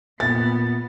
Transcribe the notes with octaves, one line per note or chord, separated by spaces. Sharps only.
A#2 B3 A6